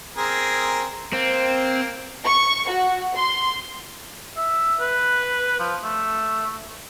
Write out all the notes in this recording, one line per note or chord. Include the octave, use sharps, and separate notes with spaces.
C4 G#4 A#4
A#3 C4
C#6
F#4
C6
E5
B4
F3
A3